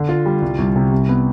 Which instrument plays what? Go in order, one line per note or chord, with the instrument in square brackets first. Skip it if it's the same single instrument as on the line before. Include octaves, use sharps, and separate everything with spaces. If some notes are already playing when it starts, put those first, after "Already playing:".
Already playing: [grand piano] D3
F4
G3
C2
C2
C3
C2
B3